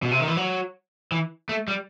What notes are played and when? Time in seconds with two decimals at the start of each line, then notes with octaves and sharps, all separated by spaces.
0.02 B2
0.11 C3
0.20 D#3
0.28 E3
0.37 F#3
1.12 E3
1.49 A3
1.68 G3